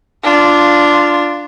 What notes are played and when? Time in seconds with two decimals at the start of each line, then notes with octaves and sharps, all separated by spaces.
0.23 D4 F4